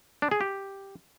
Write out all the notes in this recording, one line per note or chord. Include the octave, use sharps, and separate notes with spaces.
D4
G#4
G4